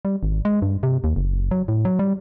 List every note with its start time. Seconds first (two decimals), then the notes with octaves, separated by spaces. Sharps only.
0.05 G3
0.23 G#1
0.45 G#3
0.62 G2
0.83 C3
1.04 D#2
1.16 F#1
1.51 F#3
1.68 A2
1.85 F#3
1.99 G3